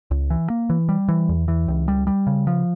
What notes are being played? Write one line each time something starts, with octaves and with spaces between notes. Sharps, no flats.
C#2
E3
A#3
E3
G3
E3
E2
E3
C#2
G3
G3
C#3
F3